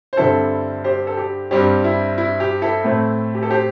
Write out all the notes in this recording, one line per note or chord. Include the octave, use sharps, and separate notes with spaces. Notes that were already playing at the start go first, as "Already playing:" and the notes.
C5
G2 D3 G3 C4 E4 A4
G4 C5
A4
G4
G2 G3 C4 G4
E4
E4
G4
E4 A4
A2 A3 C4
G4
A4
G4 C5